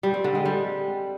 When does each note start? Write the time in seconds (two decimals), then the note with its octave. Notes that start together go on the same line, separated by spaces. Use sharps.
0.03 G3
0.14 C4
0.24 D3
0.35 G#3
0.45 G3